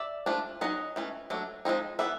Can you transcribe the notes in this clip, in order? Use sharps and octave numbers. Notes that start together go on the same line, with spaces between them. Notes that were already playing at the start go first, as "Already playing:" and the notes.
Already playing: D5 E5
F3 A3 D4
F#3 B3 D#4 C#5 D#5
E3 A3 C#4
F#3 A3 D4
F3 G#3 C4 D#4
E3 G3 B3 E5